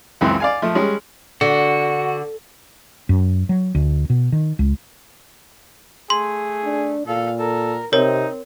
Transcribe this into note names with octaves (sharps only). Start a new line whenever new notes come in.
C#2 F#2 E3 C4
D5 F5 G#5
F3 A3
G3 G#3 C#4
D3 F#4
F#2
F#3
D2
B2
D#3
C#2
A3 G#4 C6
D4
A#2 A4 F5
A4 A#4
C3 C4 D#4 A#4 C#5